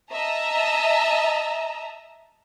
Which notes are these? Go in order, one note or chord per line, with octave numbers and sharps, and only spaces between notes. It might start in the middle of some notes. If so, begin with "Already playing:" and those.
D#5 E5 A5 A#5